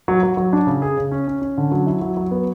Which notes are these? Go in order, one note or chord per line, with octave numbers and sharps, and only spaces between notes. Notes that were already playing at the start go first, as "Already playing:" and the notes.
F#3
F#3
F#3
D4
C#3
G#4
C#3
C#4
C#4
C#4
D3
F#3
E4
F#3
F#3
B3